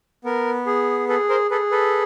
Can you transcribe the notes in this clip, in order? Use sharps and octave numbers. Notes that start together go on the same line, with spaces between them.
B3 A#4
G#4
G#4 A4 B4
A#4 C5
G#4 A4 B4
A4 B4